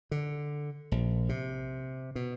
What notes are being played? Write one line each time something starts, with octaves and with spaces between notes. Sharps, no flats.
D3
A#1
C3
B2